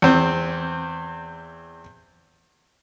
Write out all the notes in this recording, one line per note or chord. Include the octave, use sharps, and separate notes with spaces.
E2 C4